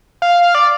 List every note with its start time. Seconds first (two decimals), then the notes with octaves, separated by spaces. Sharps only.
0.22 F5
0.55 D5